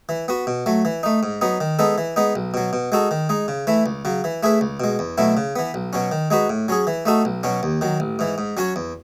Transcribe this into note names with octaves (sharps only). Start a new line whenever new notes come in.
E3
B3 F#4
B2
F#3 A3
E3
A3 D#4
G#2
F#3 B3 D#4
D#3
G#3 B3 D#4 A4
E3
G#3 B3 D#4
B1
B2 F#3
B2
G#3 D#4 F#4 A4
D#3
G#3 D#4
C#3
E3 A3 E4
C#2
C#3 F#3
E3
A3 E4 G#4 B4
C#2
B2 G#3
E2
B2 F#3 A3 E4
C#3
E3 B3
B1
B2 F#3 C#4
D#3
G#3 D#4 F#4 B4
A2
F#3 C#4 G#4
E3
A3 D#4 F#4 A4
B1
B2 F#3 C#4
D#2
D#3 F#3
A1
G#2 E3
G#2
F#3 C#4 F#4 C#5
E2